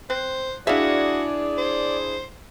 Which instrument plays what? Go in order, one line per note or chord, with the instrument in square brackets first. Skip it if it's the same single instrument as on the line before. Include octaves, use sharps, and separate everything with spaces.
[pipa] C4 [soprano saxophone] C5 [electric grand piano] F#6
[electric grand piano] D4 E4 G#4 [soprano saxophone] F#4 [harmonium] D5 [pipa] E5 F5
[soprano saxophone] C5